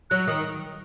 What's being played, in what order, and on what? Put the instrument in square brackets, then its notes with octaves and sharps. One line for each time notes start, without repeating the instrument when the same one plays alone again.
[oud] F#3 [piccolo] F#6
[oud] D#3 [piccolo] D#6